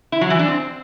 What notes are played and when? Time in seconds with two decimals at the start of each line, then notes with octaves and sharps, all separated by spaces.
0.12 E4
0.21 F#3
0.30 E3
0.39 D4
0.48 C4